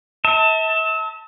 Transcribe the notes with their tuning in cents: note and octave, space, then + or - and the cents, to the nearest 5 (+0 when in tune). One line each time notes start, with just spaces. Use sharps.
E5 -40 A5 +20